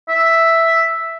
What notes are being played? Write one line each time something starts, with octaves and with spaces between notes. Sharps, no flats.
E5